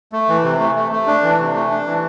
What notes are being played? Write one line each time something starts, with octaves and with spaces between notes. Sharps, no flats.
A3
E3
C3
A3
A3
A3
D4
E3
C3
A3
D4
E3